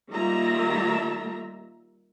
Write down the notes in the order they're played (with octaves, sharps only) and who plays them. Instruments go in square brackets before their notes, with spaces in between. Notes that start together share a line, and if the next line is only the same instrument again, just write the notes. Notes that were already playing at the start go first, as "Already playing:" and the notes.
[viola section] D#3 G3 A#3 F4 E5 A#5